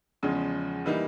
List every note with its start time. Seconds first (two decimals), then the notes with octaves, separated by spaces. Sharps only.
0.23 E2 C#3 F3 G#3 C#4
0.86 E3 G3 A#3 D#4